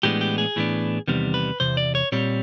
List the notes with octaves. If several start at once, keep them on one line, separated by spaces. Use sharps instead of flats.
A2 E3 G#3 B3 D4 G4
G4
G#4
A2 E3 G#3 B3 D4
E2 C3 D#3 G3 B3
B4
E2 C3 C5
D5
C#5
A#2 G3 C4 C#5